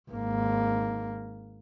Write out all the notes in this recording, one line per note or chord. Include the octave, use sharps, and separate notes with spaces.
G#1 A#3